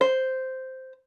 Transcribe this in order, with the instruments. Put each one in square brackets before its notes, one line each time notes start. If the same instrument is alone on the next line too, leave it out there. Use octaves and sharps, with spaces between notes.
[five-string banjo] C5